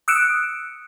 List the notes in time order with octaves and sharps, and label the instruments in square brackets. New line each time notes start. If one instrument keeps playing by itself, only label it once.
[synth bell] D#6 E6 F#6 C#7 D7 E7